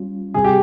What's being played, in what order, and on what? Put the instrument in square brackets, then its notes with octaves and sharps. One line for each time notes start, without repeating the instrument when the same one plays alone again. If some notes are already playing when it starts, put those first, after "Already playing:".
Already playing: [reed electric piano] G3 C#4 F4
[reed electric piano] C3 G3 C4 [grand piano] G#4
[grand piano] G4